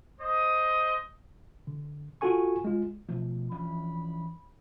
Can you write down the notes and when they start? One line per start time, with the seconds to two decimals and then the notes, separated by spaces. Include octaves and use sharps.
0.21 C5 D#5
1.67 D3
2.21 F4 F#4 A4 G#5 C#6
2.64 G#3 F4
3.09 B2 F3 A3
3.51 E3 C#4 D4 B5